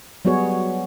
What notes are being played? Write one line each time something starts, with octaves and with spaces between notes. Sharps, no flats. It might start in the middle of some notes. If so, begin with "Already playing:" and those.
F#3 G3 B3 F#4 G#4 C#5